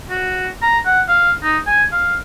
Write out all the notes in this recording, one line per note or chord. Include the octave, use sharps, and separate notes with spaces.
F#4
A#5
F#5
F5
D#4
G#5
F5